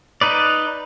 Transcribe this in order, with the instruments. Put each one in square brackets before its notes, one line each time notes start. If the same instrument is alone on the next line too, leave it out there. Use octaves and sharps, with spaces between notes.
[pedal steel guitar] D#4 B4 D5